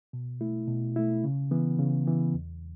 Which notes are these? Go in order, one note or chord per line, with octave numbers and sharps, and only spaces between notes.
B2
A3 E4
B2
A3 E4
C#3
E3 B3
C#3
E3 B3
E2